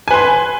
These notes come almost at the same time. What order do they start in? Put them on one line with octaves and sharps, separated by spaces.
G#5 B4 C6